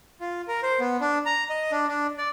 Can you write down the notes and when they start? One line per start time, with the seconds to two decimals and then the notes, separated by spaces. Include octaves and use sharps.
0.20 F4
0.48 A#4
0.63 C5
0.80 B3
1.01 D4
1.26 A#5
1.50 D#5
1.72 D4
1.88 D4
2.18 D5